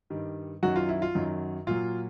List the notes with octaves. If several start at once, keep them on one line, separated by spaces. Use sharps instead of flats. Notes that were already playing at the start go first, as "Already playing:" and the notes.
G2 D#3 G3
F#2 D#3 F#3 F#4
F4
E4
F4
F#2 D#3 F#3
A#2 F#3 F4